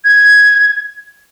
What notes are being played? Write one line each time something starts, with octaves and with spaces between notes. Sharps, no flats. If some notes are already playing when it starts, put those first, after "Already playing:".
G#6